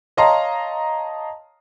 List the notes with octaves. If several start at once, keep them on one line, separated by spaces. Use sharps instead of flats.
C#5 D#5 F5 A5 A#5 C6